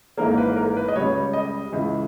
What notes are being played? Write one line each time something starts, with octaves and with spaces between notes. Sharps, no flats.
G#1 G#2 E3 A#3 A#4
B4
A#4
B4
D#5
C#2 C#3 G3 C#5
D#5
C#2 C#3 E3